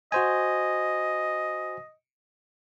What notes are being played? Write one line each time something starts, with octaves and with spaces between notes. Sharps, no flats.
F#4 C5 D#5 G#5